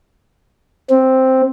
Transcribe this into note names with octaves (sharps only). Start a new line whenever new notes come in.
C4